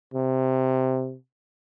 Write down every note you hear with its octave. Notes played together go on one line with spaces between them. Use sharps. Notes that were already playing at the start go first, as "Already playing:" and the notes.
C3